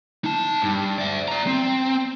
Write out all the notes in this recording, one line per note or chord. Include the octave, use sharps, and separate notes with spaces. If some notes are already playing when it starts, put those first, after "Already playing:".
D#4 A5
G2
D5 E5
D5 A#5
C4